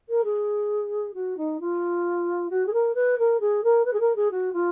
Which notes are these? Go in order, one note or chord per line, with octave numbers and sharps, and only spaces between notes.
A#4
G#4
F#4
D#4
F4
F#4
G#4
A#4
B4
A#4
G#4
A#4
B4
G#4
A#4
G#4
F#4
F4